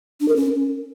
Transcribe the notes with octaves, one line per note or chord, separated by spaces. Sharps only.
D4
A#4
C#4